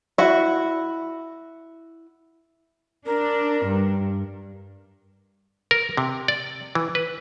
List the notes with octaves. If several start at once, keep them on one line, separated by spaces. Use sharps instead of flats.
E4 F#4
D4 A#4
G2
A#4
C3
D5
E3
B4